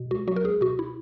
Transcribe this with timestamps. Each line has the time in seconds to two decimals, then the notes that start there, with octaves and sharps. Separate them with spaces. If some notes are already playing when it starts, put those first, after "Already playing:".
Already playing: B2
0.11 C#2 F#4
0.28 F#3 F#4
0.36 A#4
0.44 C#2 G#4
0.61 B2 F#4
0.79 E4